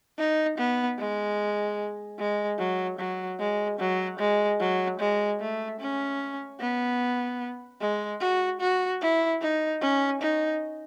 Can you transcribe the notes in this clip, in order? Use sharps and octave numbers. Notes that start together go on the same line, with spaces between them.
D#4
B3
G#3
G#3
F#3
F#3
G#3
F#3
G#3
F#3
G#3
A3
C#4
B3
G#3
F#4
F#4
E4
D#4
C#4
D#4